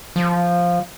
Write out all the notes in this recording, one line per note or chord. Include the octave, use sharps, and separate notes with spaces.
F3